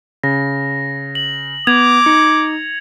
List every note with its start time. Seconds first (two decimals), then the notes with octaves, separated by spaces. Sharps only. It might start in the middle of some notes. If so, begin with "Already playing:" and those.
0.23 C#3 A#6
1.15 F#7
1.67 B3 D6 G#6 F7 F#7
2.06 D#4 C#7